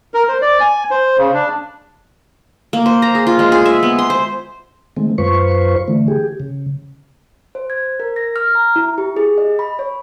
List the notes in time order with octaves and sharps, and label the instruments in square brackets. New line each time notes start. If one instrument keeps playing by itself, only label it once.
[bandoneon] A#4
C5
D5
G#5
C5
C#3
D4
[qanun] A#3
C5
A#5
G#4
F4
G#3
G#4
E5
B3
C6
C5
[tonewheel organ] D#3 G#3 A3 C4
F#2 F4 B4 C5 C#6
D3 E3 A3
G4 G#4
C#3
[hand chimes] C5
G#6
A#4
A#6
F6
A#5
E4
G4
G#4
D#5
B5
C#5